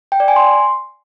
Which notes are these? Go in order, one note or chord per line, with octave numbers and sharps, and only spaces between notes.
G5
D5
G#5
C6